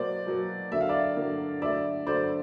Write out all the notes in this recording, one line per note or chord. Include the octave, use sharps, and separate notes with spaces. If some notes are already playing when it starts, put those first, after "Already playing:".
Already playing: B2 F#3 A#3 C5 D5
B2 F#3 A#3
D3 F#3 A#3 E5
F5
D5 E5
D3 F#3 A#3
D3 F#3 A3 D5 E5
D3 F#3 A3 C5 D5